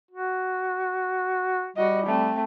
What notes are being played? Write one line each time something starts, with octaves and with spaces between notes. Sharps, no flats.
F#4
G3 F#4 D#5
A3 C4